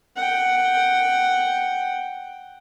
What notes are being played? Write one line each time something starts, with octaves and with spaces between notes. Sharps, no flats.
F#5 G5